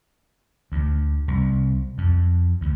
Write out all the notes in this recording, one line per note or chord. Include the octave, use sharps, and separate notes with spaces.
D2
C2
F2
D2